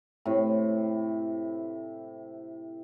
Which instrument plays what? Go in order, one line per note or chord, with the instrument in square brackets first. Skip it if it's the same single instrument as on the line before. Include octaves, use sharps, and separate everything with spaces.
[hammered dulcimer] A2 C3